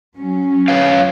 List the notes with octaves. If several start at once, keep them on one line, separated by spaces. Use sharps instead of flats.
F#3 C#4
B4 C#5 F5